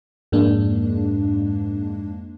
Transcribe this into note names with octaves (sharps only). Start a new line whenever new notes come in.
F2 G#2 G#3 A#3 D4